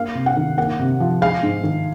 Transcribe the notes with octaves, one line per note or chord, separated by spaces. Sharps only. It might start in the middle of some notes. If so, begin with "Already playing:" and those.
Already playing: A#3 F5
C3
F#5
D#3
A#3 F#5
C3
F3
G#3 F5
G#2
D#3